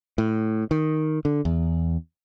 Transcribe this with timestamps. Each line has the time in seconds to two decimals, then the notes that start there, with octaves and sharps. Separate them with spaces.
0.18 A2
0.71 D#3
1.25 D3
1.45 E2